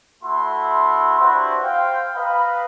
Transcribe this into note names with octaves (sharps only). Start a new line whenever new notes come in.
A3 E4 F#4 C6
D4 E4 F#4 G4 B4 C5
C5 F5 G5
B4 D#5 F5 A#5 B5